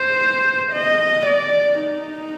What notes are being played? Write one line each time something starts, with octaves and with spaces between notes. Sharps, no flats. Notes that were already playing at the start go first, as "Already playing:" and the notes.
Already playing: C5
D#5
D5
D#4